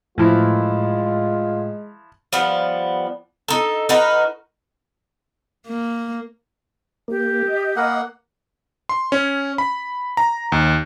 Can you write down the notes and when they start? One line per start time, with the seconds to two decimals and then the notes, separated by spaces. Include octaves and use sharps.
0.18 A2 E3 F3 G#3 E4 F4
2.33 F3 G3 B3
3.48 D#4 A4
3.89 D#4 F#4 A#4 B4
5.67 A#3
7.08 A#3 G4
7.47 D#5
7.76 A#3 A#4 F#5 G#5 B5
8.89 C6
9.12 C#4
9.58 B5
10.17 A#5
10.52 D#2